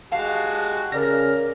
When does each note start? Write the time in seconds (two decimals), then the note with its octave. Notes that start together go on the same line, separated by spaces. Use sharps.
0.12 G#3 F#4 G4 F5 A5
0.92 C#3 A#4 D5 F6 A#6